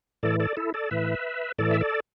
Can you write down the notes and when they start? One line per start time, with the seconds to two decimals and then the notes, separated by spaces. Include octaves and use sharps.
0.23 A2 E3 A4 D5
0.40 A4 D5
0.57 E4 A4
0.74 A4 D5
0.91 A2 E3 B4 E5
1.58 A2 E3 A4 D5
1.71 E5
1.81 A4 D5